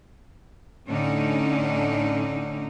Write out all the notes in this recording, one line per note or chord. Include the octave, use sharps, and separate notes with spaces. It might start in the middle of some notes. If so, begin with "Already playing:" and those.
A2 D3 C#4 D#4